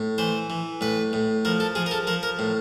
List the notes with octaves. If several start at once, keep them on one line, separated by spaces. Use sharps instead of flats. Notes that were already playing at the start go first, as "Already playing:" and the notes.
Already playing: A2
E3 C5
E3
A2 B4
A2
F3 A#4
A4
F3 G#4
A#4
A4
F3 A#4
A#4
A2